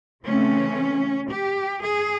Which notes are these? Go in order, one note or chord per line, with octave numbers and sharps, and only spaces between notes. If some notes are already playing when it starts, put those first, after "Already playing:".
C#3 E3 A3 C4 C#4
G4
G#4